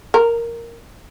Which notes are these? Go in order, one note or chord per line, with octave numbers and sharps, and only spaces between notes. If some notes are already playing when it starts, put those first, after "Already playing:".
A#4